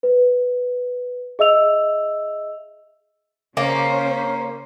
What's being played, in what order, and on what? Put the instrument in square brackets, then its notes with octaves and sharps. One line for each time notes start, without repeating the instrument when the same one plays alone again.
[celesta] B4
G#4 D#5 E5 E6 F7
[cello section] C#3 C#4 C5 [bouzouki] A#3 [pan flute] C#5